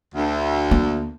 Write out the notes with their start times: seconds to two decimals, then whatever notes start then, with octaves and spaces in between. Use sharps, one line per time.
0.15 D2
0.71 A#3